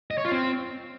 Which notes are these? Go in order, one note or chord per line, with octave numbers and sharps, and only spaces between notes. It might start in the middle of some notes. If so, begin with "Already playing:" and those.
D#5
C#5
F4
C4